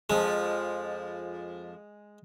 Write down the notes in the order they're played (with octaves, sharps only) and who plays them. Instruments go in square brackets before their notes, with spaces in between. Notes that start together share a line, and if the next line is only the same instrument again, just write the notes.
[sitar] F2 F3 [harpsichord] G#3